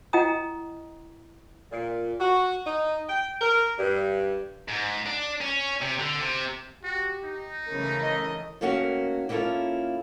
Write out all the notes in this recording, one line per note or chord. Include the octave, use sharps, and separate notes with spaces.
E4 D#5 F#5 G5 A#5 D#6
A#2
F#4
D#4
G5
A#4
G2
G#2
D4
C#4
C3
D3
C3
F#4 G4
D#4
C#3 E3 A3 A#4
D#5
D#3 A3 A#3 C#4 F#4
A#3 B3 C#4 E4 F4 A4